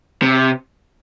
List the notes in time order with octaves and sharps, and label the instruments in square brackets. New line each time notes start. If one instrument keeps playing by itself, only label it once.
[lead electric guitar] C3